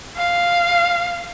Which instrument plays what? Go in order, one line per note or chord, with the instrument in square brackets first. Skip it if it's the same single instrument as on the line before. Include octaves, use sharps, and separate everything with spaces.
[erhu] F5